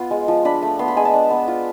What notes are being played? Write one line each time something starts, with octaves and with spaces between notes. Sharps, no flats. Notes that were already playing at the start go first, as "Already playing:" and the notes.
Already playing: B3 F4 C6
G#3
F3
D4 B5
A3
B3 C6
B5
G#3 G#5
A5
D4
B3
F4